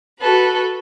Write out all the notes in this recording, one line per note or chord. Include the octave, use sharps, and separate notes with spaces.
F#4 A4 B4